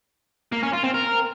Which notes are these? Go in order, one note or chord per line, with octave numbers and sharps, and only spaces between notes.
A#3
C#4
F4
C4
A#4